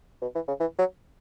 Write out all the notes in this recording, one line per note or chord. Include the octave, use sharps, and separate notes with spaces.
B2
E3
C#3
E3
F#3